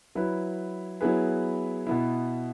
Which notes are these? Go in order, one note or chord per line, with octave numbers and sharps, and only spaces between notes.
F#3 E4 B4
F#3 B3 E4 G#4 B4
B2 B3 E4